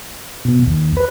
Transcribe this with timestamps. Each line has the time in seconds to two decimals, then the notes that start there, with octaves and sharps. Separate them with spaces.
0.45 B2
0.67 D#2
0.97 B4